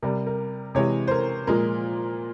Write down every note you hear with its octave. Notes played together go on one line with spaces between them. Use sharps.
C3 G3 A#4
A#4
C3 E3 G#3 C#5
C5
A#4
A#2 F3 G#3 A#4